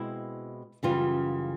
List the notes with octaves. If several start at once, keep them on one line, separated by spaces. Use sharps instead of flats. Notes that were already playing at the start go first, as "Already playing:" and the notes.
Already playing: B2 G#3 C4 E4
F#2 C#3 E3 G3 F4